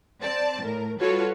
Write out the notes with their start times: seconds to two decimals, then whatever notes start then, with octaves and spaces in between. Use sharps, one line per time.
0.21 C4 D5 A5
0.63 A2 A#4
0.99 G3 F4 F#4 A4 B4 C#5